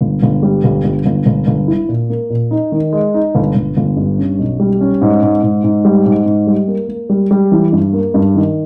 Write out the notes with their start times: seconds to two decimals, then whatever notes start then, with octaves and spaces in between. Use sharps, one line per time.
0.01 G1
0.22 G1
0.43 G3
0.64 G1
0.84 G1
1.06 G1
1.26 G1
1.47 G1
1.68 E4
1.89 A#2
2.10 A#3
2.30 A#2
2.51 D#4
2.72 D#3
2.93 G#3
3.14 D#4
3.35 G1
3.55 G1
3.77 G1
3.97 G2
4.18 C#4
4.39 B1
4.60 G3
4.81 C#4
5.01 G#2
5.22 G#2
5.43 G#2
5.64 G#2
5.85 G3
6.06 G#2
6.26 G#2
6.47 G3
6.68 A#3
6.89 A#3
7.10 G3
7.31 G3
7.52 E3
7.72 G2
7.93 A#3
8.14 G2
8.35 D#3